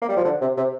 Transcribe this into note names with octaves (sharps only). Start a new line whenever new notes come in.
A#3
G3
F3
D3
C3
C3